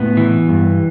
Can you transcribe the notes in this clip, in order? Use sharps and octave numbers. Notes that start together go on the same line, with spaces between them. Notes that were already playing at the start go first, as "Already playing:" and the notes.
Already playing: A2 B3
E3
G2